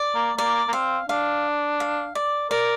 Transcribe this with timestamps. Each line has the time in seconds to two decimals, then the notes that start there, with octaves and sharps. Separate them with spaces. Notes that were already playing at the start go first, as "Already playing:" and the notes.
Already playing: D5
0.15 A#3
0.37 A#3 D5
0.68 A#3
0.73 C4 F5
1.09 D4 F5
1.80 F5
2.15 D5
2.51 A#4 D5